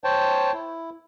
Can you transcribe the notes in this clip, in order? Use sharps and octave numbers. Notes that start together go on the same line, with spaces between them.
C5 C#5 G5 A5
E4